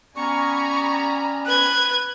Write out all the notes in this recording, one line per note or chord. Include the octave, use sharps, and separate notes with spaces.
G3 B3 C#4 G#5 A#5 B5 C#6
B4 F#6 G#6